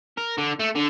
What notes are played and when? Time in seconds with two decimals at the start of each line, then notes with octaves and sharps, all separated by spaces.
0.17 A#4
0.38 D3
0.59 A3
0.75 D3